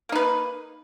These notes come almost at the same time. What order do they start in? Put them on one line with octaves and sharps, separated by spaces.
A#3 D#4 B4